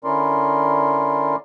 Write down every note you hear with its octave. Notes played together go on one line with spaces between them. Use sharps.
D3 C#4 E4 A#4 D5 C6